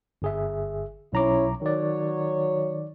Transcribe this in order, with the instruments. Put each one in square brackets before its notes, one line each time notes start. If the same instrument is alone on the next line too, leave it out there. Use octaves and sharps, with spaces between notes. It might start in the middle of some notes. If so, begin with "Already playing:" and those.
[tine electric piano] G1 G#4 E5
[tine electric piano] B1 A#5 D6 [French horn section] C#4 E4 C#5
[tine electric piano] D#3 D5 [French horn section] F#3 C#5